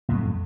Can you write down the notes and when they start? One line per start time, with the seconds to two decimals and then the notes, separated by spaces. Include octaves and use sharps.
0.09 A2
0.11 F2
0.14 F#3
0.17 A3